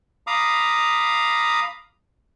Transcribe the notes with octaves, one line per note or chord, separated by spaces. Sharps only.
F5 A#5 B5 D6 D#6